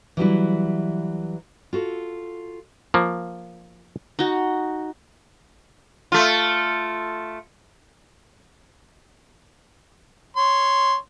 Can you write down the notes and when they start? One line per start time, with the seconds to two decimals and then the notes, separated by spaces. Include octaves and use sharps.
0.17 E3 F#3 G3 E4
1.73 F4 F#4 A4
2.94 F3 A#3
4.19 D#4 F#4
6.12 A3 F4
10.37 C#5 C6